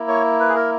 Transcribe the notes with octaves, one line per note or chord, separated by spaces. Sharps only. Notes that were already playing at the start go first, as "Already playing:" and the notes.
Already playing: A#3 E4
C#5
B4
G#4
A#4